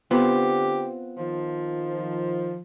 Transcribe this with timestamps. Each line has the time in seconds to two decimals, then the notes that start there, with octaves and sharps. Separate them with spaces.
0.11 D3 B3 C4 F4 G4
1.17 D#3 F3